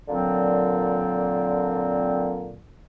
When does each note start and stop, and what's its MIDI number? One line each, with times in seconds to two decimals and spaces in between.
0.09 2.59 46
0.09 2.59 50
0.09 2.59 54
0.09 2.59 60